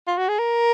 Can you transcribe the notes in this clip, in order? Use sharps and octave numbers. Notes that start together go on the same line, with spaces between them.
F4
F#4
G#4
A#4